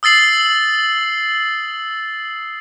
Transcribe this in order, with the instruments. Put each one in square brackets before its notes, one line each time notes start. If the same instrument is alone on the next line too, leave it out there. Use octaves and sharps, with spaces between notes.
[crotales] D#6 E6 A6 C7 F#7